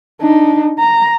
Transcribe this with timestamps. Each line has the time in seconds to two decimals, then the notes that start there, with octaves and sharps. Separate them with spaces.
0.22 D4 D#4
0.79 A#5